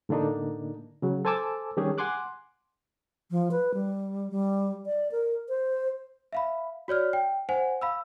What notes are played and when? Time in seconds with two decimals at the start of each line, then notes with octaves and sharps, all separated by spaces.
0.09 A2 D3 A#3 D4 D#4
1.02 C#3 F#3
1.25 A4 C5 G#5 A5 D6 E6
1.77 D#3 G3 C#4 D4 G4 G#4
1.98 F#5 G#5 C6 D6 F#6
3.31 F3
3.51 B4
3.74 G3
4.31 G3
4.86 D5
5.11 A#4
5.49 C5
6.33 E5 F5 B5
6.88 F#4 C#5 D5 F6
7.13 G5
7.49 C5 F#5 G#5
7.81 F5 B5 E6